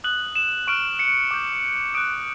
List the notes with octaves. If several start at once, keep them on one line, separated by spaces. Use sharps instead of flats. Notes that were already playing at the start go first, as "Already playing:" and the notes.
D#6 F#6 F#7
E7
C#6 F6 D7
C#7
D6 G6
D#6 F#6 D7